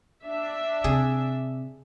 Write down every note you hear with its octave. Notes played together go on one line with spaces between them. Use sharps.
D4 E5
C3 G#4